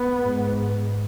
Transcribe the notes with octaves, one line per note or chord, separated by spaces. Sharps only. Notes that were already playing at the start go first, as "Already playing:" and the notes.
Already playing: B3
G#2